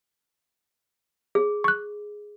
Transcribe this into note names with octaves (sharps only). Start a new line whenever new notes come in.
G#4
C#6 F#6